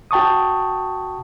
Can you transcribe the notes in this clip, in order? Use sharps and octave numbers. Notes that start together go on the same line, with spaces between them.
F#4 G5 A5 C#6 D#6